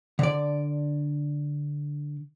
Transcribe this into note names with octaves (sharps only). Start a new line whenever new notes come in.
D3 D5